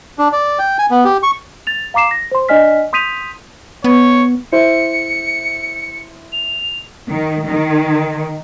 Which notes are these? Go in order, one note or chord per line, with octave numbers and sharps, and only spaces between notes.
D4
D5
G5
G#5
B3
G4
C#6
A6 F7
F5 A#5 D6 C7 E7
A#6
C5 C6
D4 D5 D#5 G#5 F6 B6
C6 D#6 G6 B6 D#7 F7
B3 C#5
E4 C5 C#7
F7
D#3
D#3